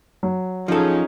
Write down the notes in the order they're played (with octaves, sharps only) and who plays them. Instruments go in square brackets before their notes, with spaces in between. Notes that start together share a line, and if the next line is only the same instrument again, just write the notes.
[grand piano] F#3
[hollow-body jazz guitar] F3 A4 [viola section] C#4 D#4 G#4